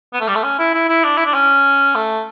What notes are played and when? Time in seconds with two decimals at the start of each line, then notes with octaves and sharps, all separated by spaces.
0.13 B3
0.21 A3
0.28 G3
0.35 A3
0.43 C#4
0.59 E4
0.74 E4
0.88 E4
1.04 D4
1.17 E4
1.25 D4
1.34 C#4
1.95 A3